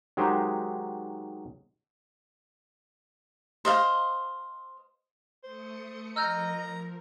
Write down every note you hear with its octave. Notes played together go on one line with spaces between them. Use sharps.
D#3 F#3 G#3 D#4 G4 C5
C5 D#5 F5
A3 C5 D#6 C#7
F3 A#4 D#5 A#5 E6 F6 G6